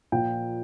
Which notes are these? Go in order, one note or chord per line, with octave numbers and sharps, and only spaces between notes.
A#2 F3 A#3 G5